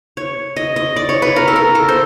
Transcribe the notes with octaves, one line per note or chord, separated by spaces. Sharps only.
C#5
D#5
D#5
D5
C#5
B4
A#4
A4
A#4
A4
C5